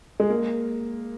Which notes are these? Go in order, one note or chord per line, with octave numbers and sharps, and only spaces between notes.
G#3
A#3